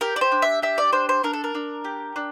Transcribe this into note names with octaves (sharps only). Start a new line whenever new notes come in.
G4 A#4
D5
C5
D4
E5
G4 E5
D5
D4 C5
C5
D4 A#4
A4
A#4
D4
G4
D4